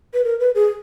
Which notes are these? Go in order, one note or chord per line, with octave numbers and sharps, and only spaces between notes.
B4
A#4
B4
G#4